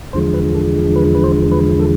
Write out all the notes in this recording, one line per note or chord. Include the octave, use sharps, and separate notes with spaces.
E2 D3 F3 G#3 C5
B4
A4
B4
B4
C5
B4
A4